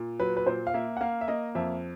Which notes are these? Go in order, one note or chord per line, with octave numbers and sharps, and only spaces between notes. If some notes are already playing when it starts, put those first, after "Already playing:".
Already playing: A#2
F#3 B4
B4
A#2 C5
F5
A#3 E5
F#5
A#3 F5
E5
A#3 D#5
F2 E5